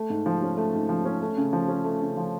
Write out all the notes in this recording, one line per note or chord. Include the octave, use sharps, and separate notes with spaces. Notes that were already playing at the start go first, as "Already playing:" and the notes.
Already playing: A3
G#2
F3
C#4
A3
G#2
F3
C#4
A3
C#3
F3
C#4
A3
C#3
F3